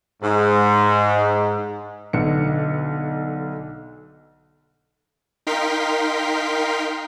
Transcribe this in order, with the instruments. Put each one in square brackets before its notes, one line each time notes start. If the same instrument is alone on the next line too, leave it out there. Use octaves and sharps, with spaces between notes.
[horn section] G#2
[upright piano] B1 D3 C#7
[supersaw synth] D#4 A#4 F5 G5 C6 B6